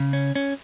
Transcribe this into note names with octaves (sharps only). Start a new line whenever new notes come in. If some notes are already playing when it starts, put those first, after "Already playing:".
Already playing: C#3
C#4
C#4